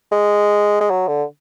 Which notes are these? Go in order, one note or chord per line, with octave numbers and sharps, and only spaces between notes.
G#3
G#3
F#3
D3